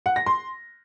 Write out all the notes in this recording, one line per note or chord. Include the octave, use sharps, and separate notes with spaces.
F#5
A#6
C6